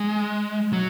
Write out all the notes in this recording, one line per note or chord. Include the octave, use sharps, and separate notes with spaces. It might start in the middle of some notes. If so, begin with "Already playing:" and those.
Already playing: G#3
F#3